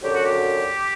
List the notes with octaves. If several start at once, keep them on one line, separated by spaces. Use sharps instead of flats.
F#2 D3 F#3 G4
F#4
G4